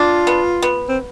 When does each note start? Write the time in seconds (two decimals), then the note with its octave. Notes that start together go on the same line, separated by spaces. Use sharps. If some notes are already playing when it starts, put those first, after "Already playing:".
Already playing: D4 F4
0.27 B3
0.62 B3
0.89 C4